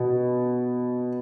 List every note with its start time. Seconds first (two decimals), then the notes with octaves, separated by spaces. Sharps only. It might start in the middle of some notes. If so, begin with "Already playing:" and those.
Already playing: B2